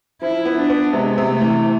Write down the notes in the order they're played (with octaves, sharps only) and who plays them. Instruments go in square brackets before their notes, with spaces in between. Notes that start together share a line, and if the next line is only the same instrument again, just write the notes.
[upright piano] F3 [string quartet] E4
[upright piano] B3
[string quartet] D4
[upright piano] B3
[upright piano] C3 [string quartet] G#3
[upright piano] C3
[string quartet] A3
[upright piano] E3